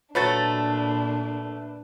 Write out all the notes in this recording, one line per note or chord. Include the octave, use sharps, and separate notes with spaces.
A#2 F#3 A3 D4 B4 A6